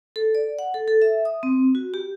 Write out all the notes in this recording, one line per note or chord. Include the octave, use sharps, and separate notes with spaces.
A4
D5
F#5
A4
A4
E5
D#6
C4
F#4
G4